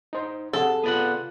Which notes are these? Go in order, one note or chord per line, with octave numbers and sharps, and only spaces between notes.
D#4 C5
C3 G#4 A4 F#5
B3 F4 D5 F#5